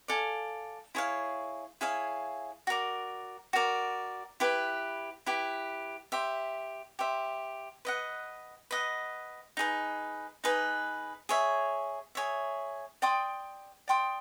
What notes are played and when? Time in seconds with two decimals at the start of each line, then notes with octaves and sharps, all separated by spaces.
0.08 A4 D5 F5 G#5
0.95 E4 G#4 C#5 F5
1.81 E4 G#4 C#5 F5
2.67 F#4 A#4 D5
3.53 F#4 A#4 D5
4.40 E4 G4 B4
5.26 E4 G4 B4
6.12 G4 C5 E5
6.99 G4 C5 E5
7.85 B4 D#5 F#5
8.71 B4 D#5 F#5
9.57 D#4 G#4 B4
10.44 D#4 G#4 B4
11.29 G#4 C#5 E5
12.15 G#4 C#5 E5
13.02 D5 G5 C6 D#6
13.88 D5 G5 C6 D#6